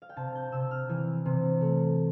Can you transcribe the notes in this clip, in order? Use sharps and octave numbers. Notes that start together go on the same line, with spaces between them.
F5
G5
C3 A5
G6
C3 E6
F6
E3
C3
A3